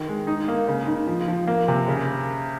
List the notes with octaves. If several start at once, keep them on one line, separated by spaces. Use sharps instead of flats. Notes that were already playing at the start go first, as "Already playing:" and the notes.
Already playing: D#3
G#3
D#4
A#3
C#3
D#4
F3
F3
A#3
C3
C#3